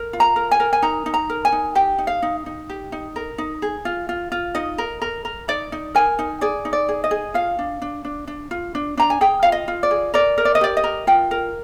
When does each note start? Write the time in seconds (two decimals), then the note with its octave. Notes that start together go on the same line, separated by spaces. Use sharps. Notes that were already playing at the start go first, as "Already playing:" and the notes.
Already playing: A#4
0.13 F4
0.20 A#5
0.36 A#4
0.51 G#5
0.60 A#4
0.73 G#5
0.82 D#4 A#5
1.06 D#4
1.14 A#5
1.30 A#4
1.45 G#5
1.52 D#4
1.75 G4 G5
1.98 D#4
2.07 F5
2.22 D#4
2.46 D#4
2.69 G4
2.92 D#4
3.16 A#4
3.38 D#4
3.62 G#4
3.85 F4
4.09 F4
4.32 F4
4.55 D#4 D#5
4.78 A#4
5.02 A#4
5.25 A#4
5.48 D#4 D5
5.72 D#4
5.95 A#4 G#5
6.19 D#4
6.41 G#4 D5
6.65 D#4
6.73 D5
6.89 G#4
7.04 D#5
7.11 G#4
7.34 F4 F5
7.59 D4
7.82 D4
8.04 D4
8.28 D4
8.51 F4
8.75 D4
8.97 D4 A#5
9.10 G#5
9.21 G#4 G5
9.43 F4 F5
9.52 D#5
9.68 F4
9.83 D5
9.91 G#4
10.14 A#4 D5
10.38 A#4
10.45 D5
10.55 D#5
10.61 G4 D5
10.77 D#5
10.84 A#4
11.07 F4 G5
11.31 A#4